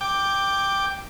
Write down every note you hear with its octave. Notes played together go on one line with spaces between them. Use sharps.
G5 D6